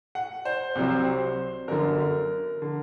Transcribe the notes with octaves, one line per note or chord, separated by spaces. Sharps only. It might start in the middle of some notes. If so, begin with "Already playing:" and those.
F#5
C5
C2 C3 F#3 C4
G1 F#2 D3 A#4
D3